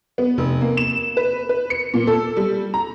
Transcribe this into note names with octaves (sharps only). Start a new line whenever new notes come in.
B3
F1
A#3
E7
B4
B4
C#7
A#2
A4
G3
A#5